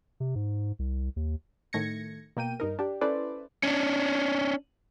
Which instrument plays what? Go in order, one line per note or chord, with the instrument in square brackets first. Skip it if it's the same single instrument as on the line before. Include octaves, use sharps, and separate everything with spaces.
[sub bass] C3
G#2
C2
D#2
[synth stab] A2 D#3 A3 G#6 A#6 C#7
B2 A#3 G5 D#7
G2 D#4 A#4
D4 G4
C#4 E4 A4 B4 C5 D5
[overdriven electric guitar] C#4 D4